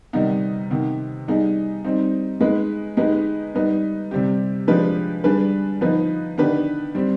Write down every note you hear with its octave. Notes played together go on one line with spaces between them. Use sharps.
C3 D#3 G3 B3 D#4
C3 D#3 B3
G3 B3 D#4 G#4
G3 C4 D#4
G#3 B3 D#4 B4
G#3 B3 D#4 G4 B4
G3 B3 D#4 B4
C3 G3 C4 G4
F3 G#3 D4 G4 B4
G3 D4 G#4 B4
F3 B3 D#4 B4
D#3 B3 D4 G4 B4
G3 C4 G4